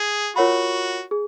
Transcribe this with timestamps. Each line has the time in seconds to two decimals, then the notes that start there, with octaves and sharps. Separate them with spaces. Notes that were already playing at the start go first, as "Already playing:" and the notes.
Already playing: G#4
0.36 F4 F#4 A#4 C#5 F#5 B5
1.11 G#4